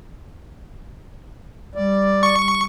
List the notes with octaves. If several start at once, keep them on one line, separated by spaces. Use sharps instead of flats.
G3 D5
C#6